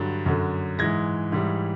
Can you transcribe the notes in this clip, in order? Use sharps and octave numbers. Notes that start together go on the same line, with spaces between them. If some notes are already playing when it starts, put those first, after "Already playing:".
Already playing: G2 D3 F#3 A6
F#2 D3 F#3
G#2 E3 G#3 G#6 A#6
G#2 E3 G3